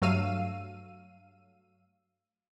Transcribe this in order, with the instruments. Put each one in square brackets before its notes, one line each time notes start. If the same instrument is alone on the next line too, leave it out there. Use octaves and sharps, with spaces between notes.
[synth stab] G2 F#3 A3 F5 E6 D#7